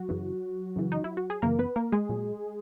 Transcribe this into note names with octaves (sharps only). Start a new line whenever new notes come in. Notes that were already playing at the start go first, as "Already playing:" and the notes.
Already playing: F#3 F#4
F#2 C#3 E3
F#2 C#3 E3
D#4
E4
F#4
G#4
F#2 C#3 E3 A#3 A#4
B3 B4
A#3 A#4
G#3 G#4
A#2 F#3